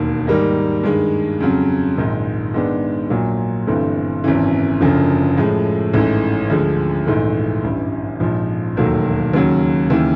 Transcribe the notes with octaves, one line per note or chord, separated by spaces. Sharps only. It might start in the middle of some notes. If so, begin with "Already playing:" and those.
Already playing: E1 D#2 D#3
G#2 D#3 G3 A#3 D#4
G2 D#3 G#3
F2 C#3 F#3
A#1 G#2 D#3
G#2 D#3 G#3 B3 D4
A#1 A#2 F#3
G1 G2 E3 A3 C4
G#1 F#2 C#3 E3
F#1 F#2 D3 F3
A2 F3 G#3
A1 G#2 E3 A3
D2 D3 F3 G#3
A#1 G#2 E3 A3
A1 G2 E3
A#1 G#2 F3
E1 D#2 D#3 F#3 A3
D#2 C#3 F#3
D#2 C#3 E3